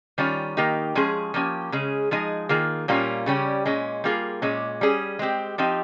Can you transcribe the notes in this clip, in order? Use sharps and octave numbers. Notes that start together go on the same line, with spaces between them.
D#3 G3 C#4 F4
D#3 A#3 D#4 G4
F3 G#3 C#4 G#4
F3 A#3 C#4 G4
C#3 G#3 C#4 G#4
F3 G#3 D#4 G#4
D#3 A#3 F4 G#4
A#2 G3 A#3 C#4 F4
C#3 G3 C#4 G4
A#2 G#3 C#4
G3 A#3 F4 G#4
A#2 G#3 C#4
G3 C#4 G#4
G#3 C4 G4
F3 C4 D#4 G4